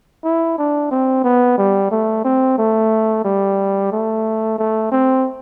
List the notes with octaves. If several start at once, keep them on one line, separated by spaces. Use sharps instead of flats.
E4
D4
C4
B3
G3
A3
C4
A3
G3
A3
A3
C4